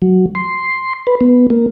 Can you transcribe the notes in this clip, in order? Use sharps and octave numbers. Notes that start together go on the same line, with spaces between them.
F#3
C6
B4
B3
A#3